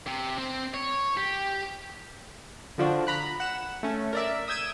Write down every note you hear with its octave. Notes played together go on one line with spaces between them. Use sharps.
C3
C4
C#5
G4
D3 F3 D4 F#4
A#5 B5 F#6
F#5 E7
A3 C#4
A#4 D5 E5
D#6 E6 G6 G#6 D7 E7